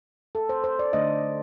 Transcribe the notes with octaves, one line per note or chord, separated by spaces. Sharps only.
A4
C5
C5
D5
D3 A3 D4 D#5